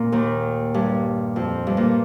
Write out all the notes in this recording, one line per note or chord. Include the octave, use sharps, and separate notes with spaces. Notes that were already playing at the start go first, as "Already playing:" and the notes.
Already playing: A#2
D#2 D#3
G2
F2
G2
A#2